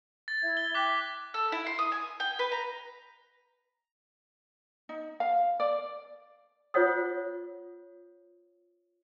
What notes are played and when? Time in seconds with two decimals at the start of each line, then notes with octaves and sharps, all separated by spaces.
0.28 A6
0.42 E4 E5 G#6
0.57 G7
0.75 G5 D6 F#6 B6
1.34 A4
1.52 E4
1.66 C6
1.79 D#6
1.92 G#5
2.20 G5
2.39 B4
2.52 A#5
4.89 D#4
5.20 F5
5.60 D5
6.74 F4 C5 C#5 F#5 D#6